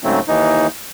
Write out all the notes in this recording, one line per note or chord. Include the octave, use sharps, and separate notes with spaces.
G#2 C#3 F#3 A3 C4
D#2 E3 D#4